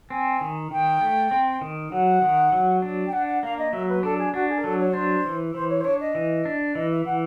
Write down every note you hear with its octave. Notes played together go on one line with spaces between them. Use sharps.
C4 G#5
D#3
D#3 G5
A3
C4
D#3
F#3 F#5
D#3
F#3
D4
G5
D4 F#5
F#5
A#3 F5
D#5
F#3 E5
B4
D4 A4
G#4
D4 F#4
G#4
A#4
F#3 A4
C#5
D4 C5
E3
E3 C5
C#5
C5
D4 C#5
D#5
E3
D4
E3 D#5
E5
E3 F#5